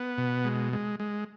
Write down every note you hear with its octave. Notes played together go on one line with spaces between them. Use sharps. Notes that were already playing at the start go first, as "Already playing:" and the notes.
Already playing: B3
B2
G#3
G#3
G#3